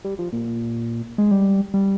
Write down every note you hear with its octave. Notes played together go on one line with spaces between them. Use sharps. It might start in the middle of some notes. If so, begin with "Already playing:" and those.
G3
F3
A#2
G#3
G3
G3